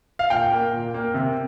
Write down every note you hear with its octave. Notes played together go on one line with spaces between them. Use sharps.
F5
A#2 G5
A#3
A#2
A#3
C3